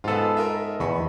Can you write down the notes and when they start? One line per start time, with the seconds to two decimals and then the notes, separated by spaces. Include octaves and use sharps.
0.04 G#2 B3 F4 A4
0.37 A#4 D#5 E5
0.80 E2 D#5 B5 C#6